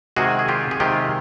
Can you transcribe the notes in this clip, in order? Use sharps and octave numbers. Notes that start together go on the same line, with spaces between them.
C3 D#3 G#3 F#4 G#4
G#4
F4 G4
G#4
C3 D#3 G#3 F4 G4